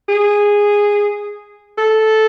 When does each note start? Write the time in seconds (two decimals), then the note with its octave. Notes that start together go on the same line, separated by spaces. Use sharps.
0.09 G#4
1.78 A4